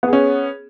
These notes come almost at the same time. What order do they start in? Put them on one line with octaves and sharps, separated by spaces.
B3 G#4 C#4